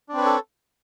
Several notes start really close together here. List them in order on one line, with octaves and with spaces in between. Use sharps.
D4 C4 B4 C#5 A4